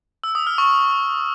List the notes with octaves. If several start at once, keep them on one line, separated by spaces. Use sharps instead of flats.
E6
D#6
F6
C#6